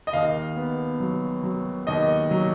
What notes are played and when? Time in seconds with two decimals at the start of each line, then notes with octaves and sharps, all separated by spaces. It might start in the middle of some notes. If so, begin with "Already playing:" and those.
0.07 D#5
0.13 D#2 F5
0.57 B3
1.00 F#3
1.43 F#3
1.87 D#2 D#5
2.31 F#3